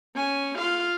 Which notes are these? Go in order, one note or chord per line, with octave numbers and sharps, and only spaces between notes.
C#4 G#5
F4 F5